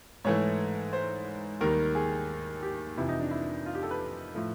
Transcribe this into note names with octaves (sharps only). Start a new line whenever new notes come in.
G#2 E3 A3 C#5
C5
D#2 D#3 G3 A#4
G#4
G4
F2 C3 E3 E4
D#4
D4
E4
F4
G4
A4
B4
A2 F3 A3